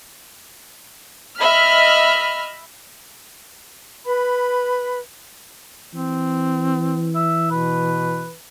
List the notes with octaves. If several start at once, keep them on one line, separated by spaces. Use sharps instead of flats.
D#5 E5 B5 F6
B4 B5
E3 C4
E5
B2 B4